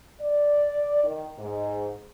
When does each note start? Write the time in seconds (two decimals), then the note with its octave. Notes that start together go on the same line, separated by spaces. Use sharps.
0.20 D5
1.04 D#3
1.39 G#2